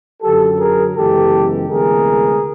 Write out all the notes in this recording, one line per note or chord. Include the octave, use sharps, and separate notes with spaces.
F#2 D3 F#3 G4 A4
G#4 A#4
F#2 C#3 E3 G#3 B3 G4 A4
D2 C3 E3 G#3 B3 G#4 A#4